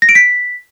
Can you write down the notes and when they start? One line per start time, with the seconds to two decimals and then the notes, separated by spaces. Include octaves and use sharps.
0.02 A#6
0.09 D7
0.15 B6